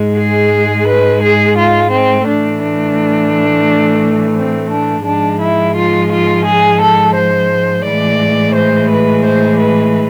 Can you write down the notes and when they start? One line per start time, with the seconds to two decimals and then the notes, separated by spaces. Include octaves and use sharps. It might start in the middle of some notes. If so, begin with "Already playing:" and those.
Already playing: G#2 G#3
0.18 G#4
0.88 B4
1.23 G#4
1.58 F4
1.92 C4
2.27 A2 E3 A3 D4
2.62 D4
4.36 C4
4.71 D4
5.06 G#2 F3 G#3 D4
5.41 E4
5.76 F4
6.11 F4
6.45 G#4
6.81 A4
7.15 C5
7.85 A2 E3 G#3 D5
8.54 C5
8.90 B4
9.25 C5
9.59 B4